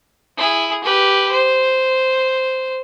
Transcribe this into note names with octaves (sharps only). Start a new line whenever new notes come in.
E4 G#4
G4 B4
C5